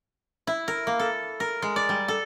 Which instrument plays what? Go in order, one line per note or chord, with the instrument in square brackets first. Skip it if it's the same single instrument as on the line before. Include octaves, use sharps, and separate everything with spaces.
[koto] E4
A#4
A#3
A4
A#4
G#3
D5
G3
A4